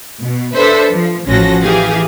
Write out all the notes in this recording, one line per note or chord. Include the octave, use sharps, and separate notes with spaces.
B2
D4 A4 B4 C5 E5
F3
A1 F3 C#4 F#4 A4 A#6
E3 G4 G#4 F5